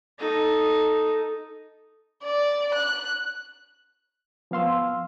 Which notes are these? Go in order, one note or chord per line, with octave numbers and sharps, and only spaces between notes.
D#4 A4
D5
F#6
F3 B3 F5 C6 E6